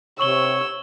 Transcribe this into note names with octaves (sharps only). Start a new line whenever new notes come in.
C3 C#5 C#6 E6 F#7 G7